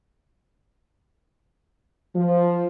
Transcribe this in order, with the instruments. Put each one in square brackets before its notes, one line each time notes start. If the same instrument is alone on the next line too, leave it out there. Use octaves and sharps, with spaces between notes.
[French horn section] F3